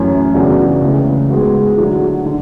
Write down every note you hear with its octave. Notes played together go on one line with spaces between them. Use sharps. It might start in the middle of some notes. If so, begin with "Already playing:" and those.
Already playing: F#2 E3 A3 C#4
E2 C#3 F#3 B3 D4
C#2 C#3 E3 A3
G#2 G#3 B3 F#4
D2 D3 F#3
D3